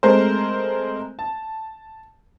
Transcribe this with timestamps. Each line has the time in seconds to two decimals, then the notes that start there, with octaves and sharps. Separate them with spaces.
0.03 G#3 A3 C4 A#4 C5
1.19 A5